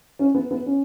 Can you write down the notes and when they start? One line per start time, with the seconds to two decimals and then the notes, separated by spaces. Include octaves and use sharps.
0.19 C#4
0.35 B3
0.51 B3
0.66 C#4